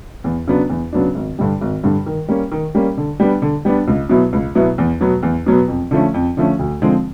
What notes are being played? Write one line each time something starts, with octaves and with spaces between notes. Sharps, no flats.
E2
C#3 F#3 B3 D4
E2
C#3 F#3 B3 D4
G#1
G2 D3 G3
G#1
G2 D3 G3
D#3
G3 A#3 C#4
D#3
G3 A#3 C#4
D3
G3 B3 D4
D3
G3 B3 D4
C#2
B2 F#3 B3 E4
C#2
B2 F#3 B3 E4
E2
B2 F#3 B3
E2
B2 F#3 B3
F2
D3 F3 A3 C#4
F2
D3 F3 A3 C#4
D2
D3 F3 G#3 C4